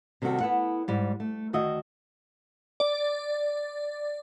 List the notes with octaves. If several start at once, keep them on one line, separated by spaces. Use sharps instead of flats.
C3 D#3 G3 D4 F#4 A4
B3 E4 A4 F#5
G#2 G3
A3
D2 D#3 F#4 D#5 E5
D5